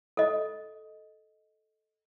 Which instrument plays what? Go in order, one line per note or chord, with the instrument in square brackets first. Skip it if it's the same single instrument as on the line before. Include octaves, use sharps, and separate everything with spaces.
[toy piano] A4 D#5